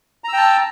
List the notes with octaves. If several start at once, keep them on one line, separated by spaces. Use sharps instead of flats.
G5 A5 A#5 E6